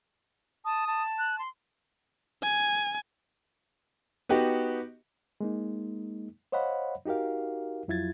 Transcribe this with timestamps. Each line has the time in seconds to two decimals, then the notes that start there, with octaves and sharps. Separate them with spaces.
0.65 A5 D#6
0.87 A5
1.19 F#6
1.39 C6
2.43 G#5
4.29 B3 D#4 F#4 G4
5.41 G#3 A#3 D#4
6.52 C5 C#5 D#5 F5 F#5 B5
7.06 D#4 F#4 G4 A#4 F5
7.88 F2 F#3 E4 F4 G#6 A6